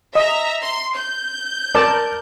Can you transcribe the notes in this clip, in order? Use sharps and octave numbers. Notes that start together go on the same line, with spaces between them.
D#5 E5 A#5
C6
G6
A#4 D5 A5